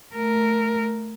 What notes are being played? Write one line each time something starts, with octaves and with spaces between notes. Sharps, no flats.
A3 A#4